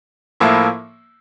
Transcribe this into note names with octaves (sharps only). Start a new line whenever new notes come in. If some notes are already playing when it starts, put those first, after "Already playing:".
A2 F3 A#3 E4